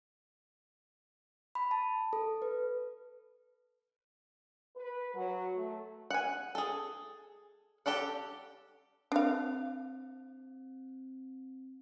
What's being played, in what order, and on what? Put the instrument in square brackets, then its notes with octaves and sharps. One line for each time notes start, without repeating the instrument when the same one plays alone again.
[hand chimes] B5
A5
A4
B4
[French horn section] B4
F#3
A3
[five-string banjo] F#5 G#5
G#4 A4
G4 A4 D5 F#5
[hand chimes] C4 [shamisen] D4 F5